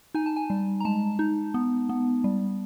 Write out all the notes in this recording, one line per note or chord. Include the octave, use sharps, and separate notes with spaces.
D#4 G#5
A5
G#5
G3
A#5
G#3 A5
D#4
B3
B3
G3